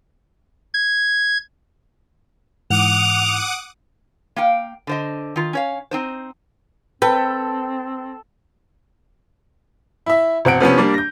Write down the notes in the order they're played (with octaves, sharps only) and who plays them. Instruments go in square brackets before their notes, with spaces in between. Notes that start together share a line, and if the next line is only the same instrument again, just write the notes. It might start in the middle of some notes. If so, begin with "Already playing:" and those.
[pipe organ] G#6
[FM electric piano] G#2 E3 [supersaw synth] F#5 D6 D#6 [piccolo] F7
[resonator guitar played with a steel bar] A#3 F5 G5
D3 C5 D#5
D#3 F4
C#4 C#5 F5
C4 D#4 C5
[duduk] C4 [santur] A4 [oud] B4 [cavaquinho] G5
[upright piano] E4 E5
E1 C4 F#5 D7
C3 F3 B3 C#4
G3 A#3 D4
G6 A#6